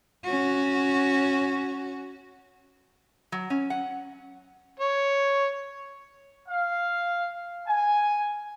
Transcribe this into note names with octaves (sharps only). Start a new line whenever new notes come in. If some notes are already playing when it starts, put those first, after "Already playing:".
C#4 F#4
F#3
C#4
F#5
C#5
F5
G#5